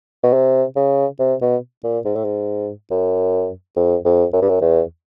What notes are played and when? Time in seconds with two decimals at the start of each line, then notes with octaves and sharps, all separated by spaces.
0.24 B2
0.33 C3
0.76 C#3
1.19 C3
1.41 B2
1.84 A#2
2.05 G#2
2.15 A2
2.24 G#2
2.91 F#2
3.76 F2
4.05 F2
4.33 F#2
4.42 G2
4.49 F#2
4.61 E2